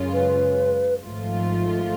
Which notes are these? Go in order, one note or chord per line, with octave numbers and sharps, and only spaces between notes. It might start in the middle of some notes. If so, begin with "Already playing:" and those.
Already playing: F#2 C#3 G#3 C#4 F4
B4
G#1 G#2 F3 A3 F4